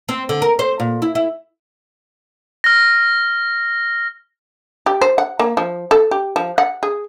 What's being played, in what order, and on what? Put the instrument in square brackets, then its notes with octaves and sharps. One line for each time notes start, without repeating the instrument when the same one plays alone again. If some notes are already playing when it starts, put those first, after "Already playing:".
[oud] C4
D3
A#4
C5
A#2
E4
E4
[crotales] F6 A#6
[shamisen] G4
C5
F#5
A#3
F3
A4
G4
F3
F#5
G#4